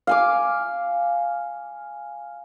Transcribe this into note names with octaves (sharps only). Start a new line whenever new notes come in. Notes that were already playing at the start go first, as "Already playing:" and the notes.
F5 G#5 D6